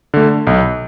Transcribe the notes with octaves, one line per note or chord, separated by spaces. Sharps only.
D3 A3
B1